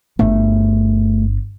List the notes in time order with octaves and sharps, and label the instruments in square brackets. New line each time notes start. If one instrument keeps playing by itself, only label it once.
[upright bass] G1 [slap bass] A3